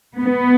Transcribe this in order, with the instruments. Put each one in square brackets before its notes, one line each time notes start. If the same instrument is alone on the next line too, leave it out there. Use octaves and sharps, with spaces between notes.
[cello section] B3